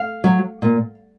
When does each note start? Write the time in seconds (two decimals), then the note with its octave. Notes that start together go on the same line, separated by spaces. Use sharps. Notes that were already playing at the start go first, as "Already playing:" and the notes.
Already playing: F5
0.24 F#3
0.62 A#2